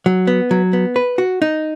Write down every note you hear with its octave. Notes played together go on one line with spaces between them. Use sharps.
F#3
B3
F#3
B3
B4
F#4
D#4